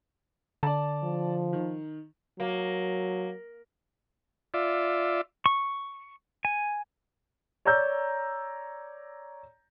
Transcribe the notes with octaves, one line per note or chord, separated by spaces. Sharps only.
D3 D5 A5
F3
D#3
F#3 A#3
F4 D5 E5
C#6
G#5
C#5 D5 A#5 E6 G6